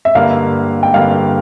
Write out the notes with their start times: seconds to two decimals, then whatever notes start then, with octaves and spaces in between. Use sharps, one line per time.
0.05 E5
0.15 G2 D3 G3 A#3 F5
0.83 G5
0.94 G2 D3 G3 A#3 F5